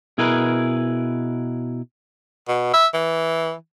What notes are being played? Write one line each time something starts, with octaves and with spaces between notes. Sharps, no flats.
B2 E4 G#4 A#4 B4
B2
E5
E3